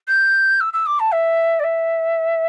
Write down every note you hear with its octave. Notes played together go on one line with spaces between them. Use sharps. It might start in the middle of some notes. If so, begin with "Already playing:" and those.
G6
E6
E6
D6
A5
E5
D5
E5